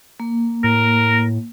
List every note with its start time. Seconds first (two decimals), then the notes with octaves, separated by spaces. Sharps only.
0.20 A#3
0.64 A2 A#4